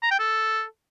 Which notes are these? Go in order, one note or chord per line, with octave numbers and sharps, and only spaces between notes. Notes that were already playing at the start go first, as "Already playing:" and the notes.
A#5
G5
A4